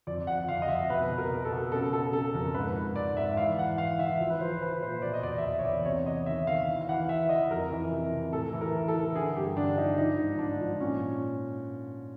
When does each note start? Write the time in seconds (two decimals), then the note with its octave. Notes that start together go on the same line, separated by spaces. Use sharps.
0.07 F2 D5
0.27 F2 F#5
0.48 F2 F5
0.62 D#5
0.69 F2 E5
0.90 B2 B4
1.10 B2
1.18 A#4
1.31 B2
1.45 A4
1.52 B2
1.72 C#3 A4
1.93 C#3 A4
2.13 C#3 A4
2.34 F2 A#4
2.54 G#2 B4
2.76 G#2
2.96 G#2 D5
3.17 G#2 E5
3.37 E3 F5
3.58 E3 F#5
3.78 E3 F5
3.99 E3 E5
4.19 F3
4.30 B4
4.41 F3 C5
4.61 F3 B4
4.82 A#2 C5
5.02 B2 D5
5.14 D#5
5.23 E2 D5
5.38 E5
5.44 E2 D#5
5.59 C#5
5.64 E2 D5
5.85 C3 C#5
6.06 E2 D#5
6.26 D#3 E5
6.47 D#3 F5
6.68 E3
6.81 F5
6.89 E3 F#5
7.08 E3 E5
7.29 E3 D#5
7.50 F2 A#4
7.71 E3
7.91 C3
8.13 C3
8.32 A2 A4
8.53 E3
8.61 A#4
8.74 E3
8.88 A4
8.95 E3
9.15 D3 G#4
9.36 G2 G4
9.57 D3 D4
9.77 F3 D#4
9.98 F3 D#4
10.18 G#2
10.39 G#2 D4
10.60 F3
10.80 A#2 C#4